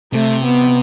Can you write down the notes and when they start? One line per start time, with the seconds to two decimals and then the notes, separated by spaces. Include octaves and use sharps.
0.13 C3 A3
0.45 B3